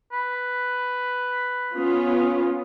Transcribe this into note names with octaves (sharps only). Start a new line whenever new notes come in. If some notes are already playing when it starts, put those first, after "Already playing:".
B4
B3 C#4 F4